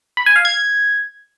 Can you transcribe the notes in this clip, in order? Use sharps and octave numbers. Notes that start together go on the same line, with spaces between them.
B5
G#5
F5
G#6